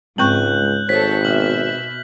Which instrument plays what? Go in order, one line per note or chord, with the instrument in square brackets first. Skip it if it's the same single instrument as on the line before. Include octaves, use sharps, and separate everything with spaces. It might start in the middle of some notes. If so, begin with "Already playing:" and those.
[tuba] C#2 [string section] G#2 [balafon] C4 G5 C#6 [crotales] F#6 G6 F#7
[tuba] G#1 [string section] A4 C#5 [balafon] C5 [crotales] F#6 B6
[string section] B2 E5 [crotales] F6 F#7